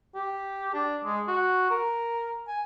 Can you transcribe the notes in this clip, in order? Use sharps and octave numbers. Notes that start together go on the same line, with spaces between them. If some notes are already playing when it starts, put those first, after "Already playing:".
G4
D4
G#3
F#4
A#4
G#5